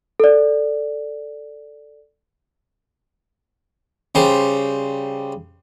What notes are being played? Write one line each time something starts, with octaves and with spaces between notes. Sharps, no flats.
A4 D5
C#3 G3 C5